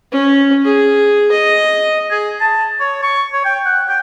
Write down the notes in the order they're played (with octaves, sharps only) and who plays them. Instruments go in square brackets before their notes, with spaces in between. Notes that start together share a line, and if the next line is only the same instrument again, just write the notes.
[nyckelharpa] C#4
G#4
D#5
[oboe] G#4
A5
C#5
C#6
C#5
G5
F#5
G5